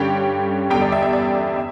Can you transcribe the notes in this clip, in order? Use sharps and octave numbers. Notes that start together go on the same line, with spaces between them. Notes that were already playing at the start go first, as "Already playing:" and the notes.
Already playing: G2 D3 G3 C#4 G4 G5
E2 D3 G3 G4 G5
D5
E5
E5
D5
E5